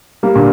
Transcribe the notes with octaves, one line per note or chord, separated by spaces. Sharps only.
G3 A#3
A#2 D3